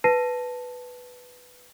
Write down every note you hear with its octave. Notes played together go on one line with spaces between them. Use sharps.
B4 A5 A#6 C7 D#7